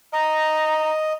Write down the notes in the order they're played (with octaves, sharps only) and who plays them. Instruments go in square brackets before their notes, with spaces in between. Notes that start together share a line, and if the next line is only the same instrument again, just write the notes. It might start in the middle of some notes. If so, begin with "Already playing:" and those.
[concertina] D#5 [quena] A#5